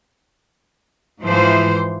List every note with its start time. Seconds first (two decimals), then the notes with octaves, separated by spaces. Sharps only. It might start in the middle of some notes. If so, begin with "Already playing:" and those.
1.22 G#2 E3 F3 C5